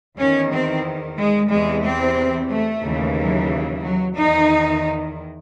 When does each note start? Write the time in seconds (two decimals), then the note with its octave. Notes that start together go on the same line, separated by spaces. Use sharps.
0.19 E2 D#3 C#4
0.52 C4
1.18 G#3
1.52 E2 C3 E3 G#3
1.85 C4
2.51 A3
2.84 D#2 C#3 E3
3.17 F#3
3.83 F#3
4.16 E2 D#3 D#4